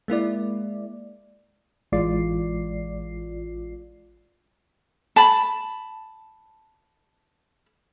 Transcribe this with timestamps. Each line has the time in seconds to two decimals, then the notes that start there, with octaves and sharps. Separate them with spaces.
0.08 G#3 A#3 E4 D5
1.92 A1 E3 G#3 F4 D5 C7
5.16 A5 B5